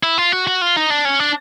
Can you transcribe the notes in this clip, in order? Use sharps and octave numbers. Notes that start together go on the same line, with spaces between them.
E4
F4
F#4
F#4
F4
D#4
D4
C#4
D4